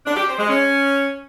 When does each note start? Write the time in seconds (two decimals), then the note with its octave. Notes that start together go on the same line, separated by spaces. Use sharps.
0.05 D4
0.16 G4
0.27 C5
0.37 G#3
0.48 C#4